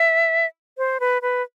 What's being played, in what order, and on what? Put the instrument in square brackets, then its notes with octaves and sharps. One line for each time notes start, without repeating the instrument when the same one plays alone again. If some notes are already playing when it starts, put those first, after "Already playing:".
Already playing: [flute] E5
C5
B4
B4